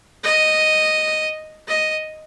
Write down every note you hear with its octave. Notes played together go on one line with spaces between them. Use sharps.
D#5
D#5